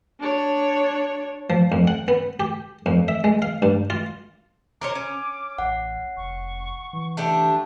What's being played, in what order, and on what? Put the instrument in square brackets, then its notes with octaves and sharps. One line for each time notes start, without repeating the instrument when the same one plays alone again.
[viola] D4 C#5
[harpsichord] F3
F2
F#5
B3
G4
F2
E5
G#3
F5
G2
F4
[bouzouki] A#4 C5 C#5 [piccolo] D6
[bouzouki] C#4
[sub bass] A1 [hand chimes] F#5
[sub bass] F1 [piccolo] C#6
[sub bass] E3
[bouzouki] A3 D4 G4